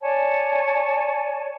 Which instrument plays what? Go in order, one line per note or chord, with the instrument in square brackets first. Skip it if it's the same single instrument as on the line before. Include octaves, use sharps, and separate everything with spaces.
[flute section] C#5 D5 G#5 A5